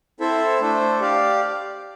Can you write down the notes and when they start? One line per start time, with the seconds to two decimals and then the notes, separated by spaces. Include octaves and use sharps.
0.20 C4 E4 A4 C5 E5
0.60 A3 D4 A4 C5
1.00 G4 D5 F5